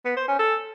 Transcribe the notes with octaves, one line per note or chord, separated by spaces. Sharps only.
B3
C5
C#4
A4